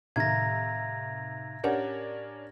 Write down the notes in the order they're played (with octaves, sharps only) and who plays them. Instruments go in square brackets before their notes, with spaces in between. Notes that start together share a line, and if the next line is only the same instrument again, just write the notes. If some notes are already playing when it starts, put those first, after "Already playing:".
[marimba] A2 [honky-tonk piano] C3 D#3 [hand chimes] E5 F5 A#5 [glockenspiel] G#6 A#6
[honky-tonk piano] C#4 D4 A#4 [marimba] G4 C#5 F#5